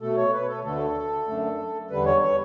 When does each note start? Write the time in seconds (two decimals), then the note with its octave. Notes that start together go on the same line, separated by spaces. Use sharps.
0.01 B2 A3 A4
0.17 C#5
0.32 B4
0.48 A4
0.64 D2 D3 A3 A4
1.27 F#2 D3 A3
1.91 E2 D3 G3 B4
2.06 C#5
2.22 C#5